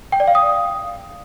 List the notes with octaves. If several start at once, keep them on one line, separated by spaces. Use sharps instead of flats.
G5
D5
F5
D#6